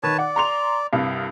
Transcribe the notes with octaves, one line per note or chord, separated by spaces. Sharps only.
D#3 B4 C#5 A5
D5 F#5
A#5 C6 F7
C2 G2 F5